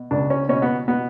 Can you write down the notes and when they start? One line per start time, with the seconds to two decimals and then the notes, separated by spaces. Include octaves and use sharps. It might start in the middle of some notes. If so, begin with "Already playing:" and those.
Already playing: B2
0.11 C#2 D4
0.30 C#4
0.49 B2 C#4
0.62 B3
0.88 B2 B3